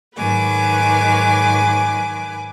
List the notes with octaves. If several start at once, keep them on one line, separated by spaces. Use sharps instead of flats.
G#2 D#3 F#3 B4 G#5 D6